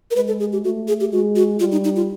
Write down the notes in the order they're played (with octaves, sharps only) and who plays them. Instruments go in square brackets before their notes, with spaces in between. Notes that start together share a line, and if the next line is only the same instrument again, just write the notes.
[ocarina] A#4
[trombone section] G#3 [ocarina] B4
[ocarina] A4
G#4
G4
[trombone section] A3 [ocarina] F#4
[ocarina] G#4
G4
[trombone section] G#3 [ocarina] F#4
[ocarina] F#4
[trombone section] G3 [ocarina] F4
[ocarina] D#4
D#4
F4